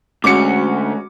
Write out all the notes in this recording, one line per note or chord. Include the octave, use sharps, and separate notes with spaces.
D2 G#3 C#4 F#4 D6 C#7